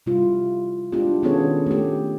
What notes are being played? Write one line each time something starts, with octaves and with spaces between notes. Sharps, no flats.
C3 G3 E4 F4
G#3 C4 D4 E4 F4 G4
D#3 B3 C#4 G#4 A4 C#5
A3 G4